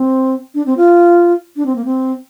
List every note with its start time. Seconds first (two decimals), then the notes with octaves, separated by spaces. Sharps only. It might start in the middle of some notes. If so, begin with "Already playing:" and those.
Already playing: C4
0.55 D4
0.66 C4
0.77 F4
1.56 D4
1.66 C4
1.76 A#3
1.85 C4